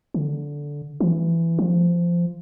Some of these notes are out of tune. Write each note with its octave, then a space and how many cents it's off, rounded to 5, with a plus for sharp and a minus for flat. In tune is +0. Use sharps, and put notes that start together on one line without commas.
D3 -10
E3 +15
F3 -15